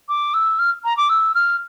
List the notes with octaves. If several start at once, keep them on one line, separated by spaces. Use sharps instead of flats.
D6
E6
F6
A#5
D6
E6
F6